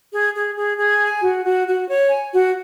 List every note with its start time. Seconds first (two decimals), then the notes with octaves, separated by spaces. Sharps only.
0.12 G#4
0.34 G#4
0.56 G#4
0.78 G#4
1.01 G#5
1.22 F#4
1.45 F#4
1.67 F#4
1.88 C#5
2.10 G#5
2.33 F#4